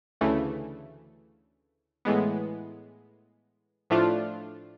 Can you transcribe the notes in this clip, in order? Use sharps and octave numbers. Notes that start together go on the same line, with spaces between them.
D2 C#3 E3 A3
A2 E3 G#3 B3
A2 F3 A3 D4 F4